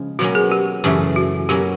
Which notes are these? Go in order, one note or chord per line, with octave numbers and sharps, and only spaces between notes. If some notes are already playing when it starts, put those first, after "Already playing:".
Already playing: C#3 F3 G#3
B2 F#3 A#3 C#4 F#4
G#4
G4
F#2 C#3 E3 A3 G4
F#4
B2 F#3 A#3 C#4 G4